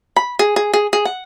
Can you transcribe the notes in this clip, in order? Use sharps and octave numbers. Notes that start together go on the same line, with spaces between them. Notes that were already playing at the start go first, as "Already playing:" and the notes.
B5
G#4
G#4
G#4
G#4
F#5